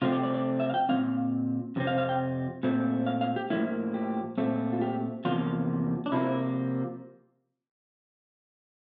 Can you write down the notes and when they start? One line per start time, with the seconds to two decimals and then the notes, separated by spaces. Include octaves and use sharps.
0.02 C3 F3 A3 C4 F4
0.12 G4
0.23 D5
0.34 D5
0.60 E5
0.70 F5
0.74 G5
0.89 A#2 G3 C4 F5
1.76 F2 C3 C4
1.87 F5
1.98 F5
2.09 G5
2.63 A#2 A3 C4
3.07 F5
3.21 F5
3.36 G4
3.50 A2 F3 A#3 E4
3.94 G4
4.38 A#2 A3 C4
4.73 F4
4.81 G4
5.25 E2 C3 F3 A#3 F4
6.06 D4
6.12 C3 F3 A#3 E4